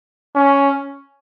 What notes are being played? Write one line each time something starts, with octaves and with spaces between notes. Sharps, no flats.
C#4